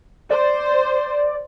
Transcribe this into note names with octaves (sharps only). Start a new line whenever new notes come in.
C5 D5